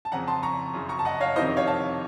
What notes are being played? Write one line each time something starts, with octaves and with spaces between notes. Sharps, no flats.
A5
F2 C#3 F#5 A#5
A5 C6
A#5 C#6
F#2 C#3
A#5 C#6
A5
D#5 F#5
C#5 F5
F2 C3 D#3 C5 D#5
C#5 F5
F5 A5